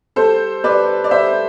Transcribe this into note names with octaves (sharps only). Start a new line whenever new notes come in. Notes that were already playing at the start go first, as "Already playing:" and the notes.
G3 A4 C5
G3 B4 D5
D5
G3 C5 E5